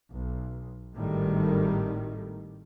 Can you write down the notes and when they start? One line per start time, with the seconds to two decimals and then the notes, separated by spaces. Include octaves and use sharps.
0.12 B1
0.94 G#1 A2 D#3 G3 A3